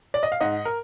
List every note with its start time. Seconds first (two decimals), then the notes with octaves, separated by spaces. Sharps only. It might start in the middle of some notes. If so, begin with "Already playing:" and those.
0.14 D5
0.23 D#5
0.32 F5
0.41 G#2 D#5 F#5
0.65 A#4